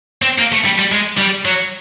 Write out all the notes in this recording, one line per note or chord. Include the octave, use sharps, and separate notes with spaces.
C4
A#3
A3
G3
G3
G#3
G3
F#3